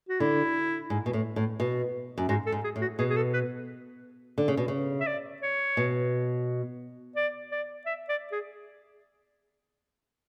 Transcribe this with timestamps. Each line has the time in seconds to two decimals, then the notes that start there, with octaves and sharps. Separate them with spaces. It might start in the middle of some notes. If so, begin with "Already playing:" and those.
0.09 F#4
0.20 D3 E4
0.90 G#2
1.06 B2
1.13 A2
1.36 A2
1.60 B2
2.18 F#2
2.29 G#2 F#4
2.46 A4
2.52 G#2
2.64 G#4
2.76 A2
2.81 F#4
2.99 B2 G#4
3.10 G#4
3.16 A4
3.33 B4
4.38 D3
4.48 C#3
4.57 B2
4.68 C#3
5.01 E5
5.07 D5
5.42 C#5
5.77 B2
7.16 D5
7.51 D5
7.86 E5
8.09 D5
8.32 G#4